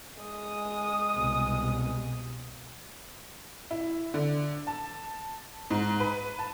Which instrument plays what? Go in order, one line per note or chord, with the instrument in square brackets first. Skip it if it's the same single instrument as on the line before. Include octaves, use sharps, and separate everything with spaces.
[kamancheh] G#3 D#6
[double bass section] C2 B2
[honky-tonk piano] E4
D3
A5
G#2
B4
A5